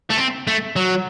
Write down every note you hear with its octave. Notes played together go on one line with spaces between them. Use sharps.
A3
C4
A3
F#3